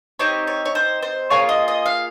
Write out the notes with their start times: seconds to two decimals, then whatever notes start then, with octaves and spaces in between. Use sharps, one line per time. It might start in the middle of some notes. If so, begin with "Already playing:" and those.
0.19 C4 D#4 G4 C#5
0.47 C#5
0.65 C#5
0.75 C5
1.02 C5
1.30 A#3 F4 G#4 C#5
1.49 D#5
1.68 D#5
1.86 F5